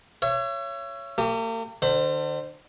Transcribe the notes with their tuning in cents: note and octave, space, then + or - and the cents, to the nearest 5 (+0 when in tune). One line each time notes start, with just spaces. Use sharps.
C#5 +0 E5 +40
A#3 -45 G4 +0
D3 +40 C5 +0 B5 +30